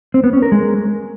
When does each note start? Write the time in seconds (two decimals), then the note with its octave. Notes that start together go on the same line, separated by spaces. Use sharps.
0.14 C4
0.24 B3
0.33 C#4
0.42 A#4
0.52 G#3